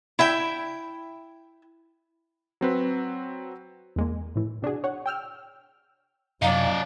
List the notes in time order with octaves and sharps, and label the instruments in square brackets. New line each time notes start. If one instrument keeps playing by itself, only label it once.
[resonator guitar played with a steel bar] E4 E5 G5
[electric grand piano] F#3 C4 B4
[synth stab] E2 G#3 A#3
A2 E3
C3 D4 F#4 G#4
C#5 F#5
G5 E6 F6
[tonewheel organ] F#2 C3 G#5 [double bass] F#3 [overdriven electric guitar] D#4 D5 [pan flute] F5